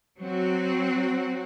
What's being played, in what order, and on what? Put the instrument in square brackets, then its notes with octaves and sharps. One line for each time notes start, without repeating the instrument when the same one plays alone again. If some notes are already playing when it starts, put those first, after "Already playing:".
[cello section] F#3 C4 F#4